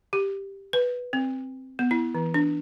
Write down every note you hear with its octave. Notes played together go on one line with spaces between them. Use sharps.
G4
B4
C4
B3
E4
E3
D4